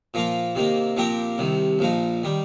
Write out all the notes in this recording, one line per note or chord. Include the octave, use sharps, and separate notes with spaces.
A#2 F3 A#3 F4
C3 D#3 A#3
A#2 F3 C4 G4 A#4
C2 C3 D#3
A#1 A#2 F3 D#4
D#3 G3